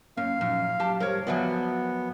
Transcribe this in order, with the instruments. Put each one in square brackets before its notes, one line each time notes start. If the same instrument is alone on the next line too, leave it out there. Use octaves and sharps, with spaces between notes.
[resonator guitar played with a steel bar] F#2 [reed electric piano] A#3 C#4 [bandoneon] F5
[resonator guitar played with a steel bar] F#2 [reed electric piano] A#2 F3 D#4
[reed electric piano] F#3 [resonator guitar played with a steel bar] G4 A5
[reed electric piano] G3 G4 C5 [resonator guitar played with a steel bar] A#4 C#5
[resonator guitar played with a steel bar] F3 F#3 D5 [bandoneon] B3 [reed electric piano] A#4 E5 G#5